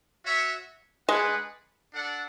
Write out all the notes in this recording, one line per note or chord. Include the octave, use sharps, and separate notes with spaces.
F#4 C#5 E5
G#3 D4 G#4 B4 F#5
D4 A4 D5 F#5